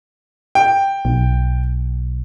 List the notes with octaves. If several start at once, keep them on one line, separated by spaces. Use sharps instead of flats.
G5
B1